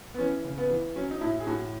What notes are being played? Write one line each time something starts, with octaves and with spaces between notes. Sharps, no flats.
B3
E3 C#4
C#3
B3
E3
F#3 C#4
D#4
A2 E4
G#4
A2 F#4